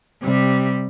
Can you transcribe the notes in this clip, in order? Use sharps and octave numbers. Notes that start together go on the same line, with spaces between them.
C3 G3